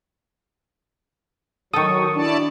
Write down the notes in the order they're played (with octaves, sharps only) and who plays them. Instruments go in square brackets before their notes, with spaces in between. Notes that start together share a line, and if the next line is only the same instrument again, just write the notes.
[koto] D#3 A4 [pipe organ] F#3 [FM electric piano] C#6 D#6
[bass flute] D4 [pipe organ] E4 D5 A5